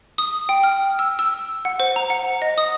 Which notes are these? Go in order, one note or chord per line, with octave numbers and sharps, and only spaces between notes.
D#6
G5
F6
E6
E6
F#5
C5
A#5
F#5
D#5
D#6